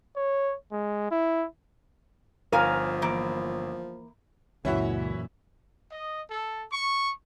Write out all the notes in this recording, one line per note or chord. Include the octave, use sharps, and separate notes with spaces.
C#5
G#3
E4
G1 F3 A#4 C#5 F5 G#5
E3 A#3
C#2 F#2 A#2 E3 C#4 E4 F#4 E5
D#5
A4
C#6